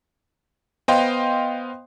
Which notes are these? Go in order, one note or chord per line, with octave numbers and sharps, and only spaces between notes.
B3 C5 D#5 F5 G5 C6